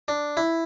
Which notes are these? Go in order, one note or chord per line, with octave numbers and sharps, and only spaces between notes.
D4
E4